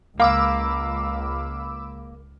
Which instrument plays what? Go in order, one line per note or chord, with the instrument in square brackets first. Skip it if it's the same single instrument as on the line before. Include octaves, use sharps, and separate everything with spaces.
[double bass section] C#2 [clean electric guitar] A#3 [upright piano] F5 [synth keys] B5 D6 E6